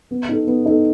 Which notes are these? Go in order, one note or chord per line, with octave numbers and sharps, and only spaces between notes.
B3
D#4 A4
B3
D#4 A4